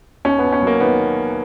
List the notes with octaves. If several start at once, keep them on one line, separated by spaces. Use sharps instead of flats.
D#2 C#4
B3
D#2
C#4
F#3 A#3
D#3 B3